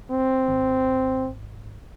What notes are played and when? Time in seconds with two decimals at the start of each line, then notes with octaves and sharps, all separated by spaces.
0.11 C4
0.48 G#1